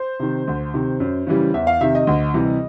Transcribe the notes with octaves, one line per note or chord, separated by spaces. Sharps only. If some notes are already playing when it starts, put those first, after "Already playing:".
Already playing: C5
C3 D#3
D2
C3 D#3
F#2
C#3 E3 G3
E2 E5
F5
C3 D#3 E5
D#5
D2
C3 E3 G3